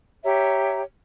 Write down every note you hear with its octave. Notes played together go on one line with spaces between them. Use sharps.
G4 C#5 E5 A#5